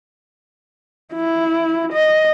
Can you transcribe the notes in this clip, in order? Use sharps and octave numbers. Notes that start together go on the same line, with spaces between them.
E4
D#5